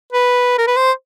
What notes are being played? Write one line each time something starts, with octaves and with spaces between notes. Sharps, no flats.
B4
A#4
B4
C5